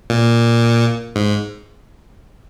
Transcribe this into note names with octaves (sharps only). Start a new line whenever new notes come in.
A#2
G#2